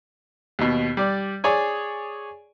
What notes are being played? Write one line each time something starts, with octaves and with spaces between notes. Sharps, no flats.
D#2 B2
G3 D5
G#4 C#5 D5 G#5